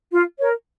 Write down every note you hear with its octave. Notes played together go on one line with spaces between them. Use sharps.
F4
A#4 C#5